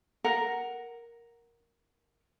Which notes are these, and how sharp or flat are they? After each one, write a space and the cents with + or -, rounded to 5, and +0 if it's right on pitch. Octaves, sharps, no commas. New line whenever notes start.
A#4 +5 F#5 +0